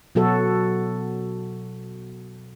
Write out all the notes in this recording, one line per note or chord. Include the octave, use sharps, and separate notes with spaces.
B2 F#3 F#4 A4